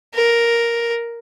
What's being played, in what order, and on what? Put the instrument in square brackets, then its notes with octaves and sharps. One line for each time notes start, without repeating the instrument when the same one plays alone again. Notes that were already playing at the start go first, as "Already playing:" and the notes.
[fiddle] A#4